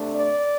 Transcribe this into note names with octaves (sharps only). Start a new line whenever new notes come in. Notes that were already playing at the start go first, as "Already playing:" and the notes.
Already playing: C3 A3 D4
D5